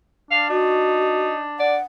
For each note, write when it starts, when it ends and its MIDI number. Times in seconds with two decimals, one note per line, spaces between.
0.31 1.85 62
0.31 0.49 77
0.50 1.44 63
0.50 1.28 66
1.59 1.76 74
1.59 1.82 78